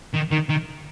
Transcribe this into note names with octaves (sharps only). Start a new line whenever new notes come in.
D#3
D#3
D#3